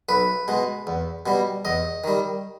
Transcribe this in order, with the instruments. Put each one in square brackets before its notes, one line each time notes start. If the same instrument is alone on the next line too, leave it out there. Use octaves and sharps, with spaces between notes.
[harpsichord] B1 B4
B2 G#3
E2
B2 G3
E2 D#5
D#3 G3